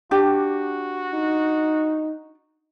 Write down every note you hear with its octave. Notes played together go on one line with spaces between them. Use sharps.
D4 F#4 G4
D#4